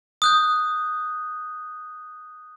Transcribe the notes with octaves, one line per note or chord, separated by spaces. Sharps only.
D#6 F#6 G6